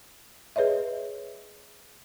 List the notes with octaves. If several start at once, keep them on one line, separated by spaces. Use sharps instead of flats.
G#4 B4 C#5 D#5 E5